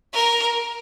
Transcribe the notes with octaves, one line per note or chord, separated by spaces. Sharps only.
A#4